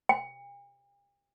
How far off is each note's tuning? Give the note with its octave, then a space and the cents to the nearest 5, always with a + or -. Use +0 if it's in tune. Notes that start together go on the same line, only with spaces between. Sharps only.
G5 +45